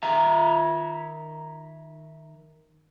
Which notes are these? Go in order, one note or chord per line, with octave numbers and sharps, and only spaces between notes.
D#3 E5 A#5